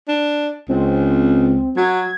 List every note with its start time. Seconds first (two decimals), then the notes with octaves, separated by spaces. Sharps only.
0.08 D4
0.69 C#2 C4
1.77 F#3 G#6